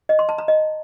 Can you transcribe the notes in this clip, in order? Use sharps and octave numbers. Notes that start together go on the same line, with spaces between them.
D#5
C6
A5
A#5
D#5